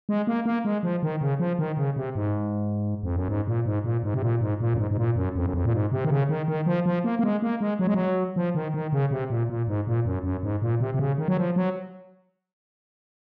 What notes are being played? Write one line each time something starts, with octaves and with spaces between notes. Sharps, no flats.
G#3
A#3
A#3
G#3
F3
D#3
C#3
F3
D#3
C#3
C3
G#2
F2
F#2
G#2
A#2
G#2
A#2
G#2
C3
A#2
G#2
A#2
F#2
G#2
G#2
A#2
F#2
F2
F#2
F2
A#2
G#2
C3
D#3
C#3
D#3
D#3
F3
F3
A#3
A#3
G#3
A#3
G#3
F#3
G#3
F#3
F3
D#3
D#3
C#3
C3
A#2
A#2
G#2
A#2
F#2
F#2
G#2
A#2
C3
C3
C#3
D#3
F#3
F3
F#3